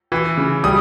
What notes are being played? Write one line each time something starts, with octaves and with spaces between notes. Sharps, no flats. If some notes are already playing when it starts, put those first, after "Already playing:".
E3
C#3
G3 D#6